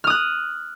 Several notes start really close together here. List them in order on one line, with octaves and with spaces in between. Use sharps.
F6 D#6 F#6